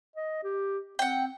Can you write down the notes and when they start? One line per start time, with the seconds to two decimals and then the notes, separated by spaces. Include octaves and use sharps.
0.16 D#5
0.44 G4
0.99 C4 F#5 G5